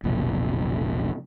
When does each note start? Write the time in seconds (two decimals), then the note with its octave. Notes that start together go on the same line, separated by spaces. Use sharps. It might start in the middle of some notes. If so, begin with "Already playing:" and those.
0.04 F1 B1 A#2 C#3